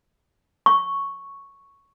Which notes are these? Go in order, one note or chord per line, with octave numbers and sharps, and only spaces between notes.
C#6